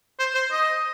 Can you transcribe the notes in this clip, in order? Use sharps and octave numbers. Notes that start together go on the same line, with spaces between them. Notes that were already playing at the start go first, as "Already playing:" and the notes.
C5
C5
D#5